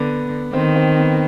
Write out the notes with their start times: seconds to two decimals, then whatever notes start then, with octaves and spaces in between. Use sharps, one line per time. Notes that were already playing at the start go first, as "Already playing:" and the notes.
Already playing: D3 B3
0.53 D#3 C4
0.76 C4
0.99 B3